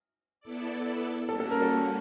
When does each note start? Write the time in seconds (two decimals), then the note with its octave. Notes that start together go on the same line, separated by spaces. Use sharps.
0.40 B3 E4 A4 D5
1.29 G3 A#3 C#4 F#4 A4
1.40 A4
1.51 A#4
1.62 A4